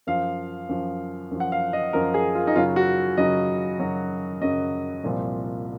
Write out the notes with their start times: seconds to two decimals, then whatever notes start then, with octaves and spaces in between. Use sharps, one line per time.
0.07 F#2 F3 F5
0.69 F#2 F3
1.31 F#2 F3
1.40 F#5
1.52 F5
1.73 D#5
1.93 F#2 F3 A#4
2.14 G#4
2.35 F4
2.47 D#4
2.55 F#2 C#3 F#3 F4
2.76 F#4
3.17 F#2 C#3 F#3 D#5
3.79 F#2 C#3 F#3
4.41 F#2 C#3 F#3 D#5
5.04 C2 A#2 F3